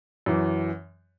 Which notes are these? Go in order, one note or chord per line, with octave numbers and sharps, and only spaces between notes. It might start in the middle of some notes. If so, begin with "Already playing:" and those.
F#2 E3